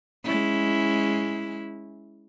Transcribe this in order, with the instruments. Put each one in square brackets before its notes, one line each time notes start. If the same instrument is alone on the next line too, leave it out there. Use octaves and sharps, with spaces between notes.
[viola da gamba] G#3 C#4 E4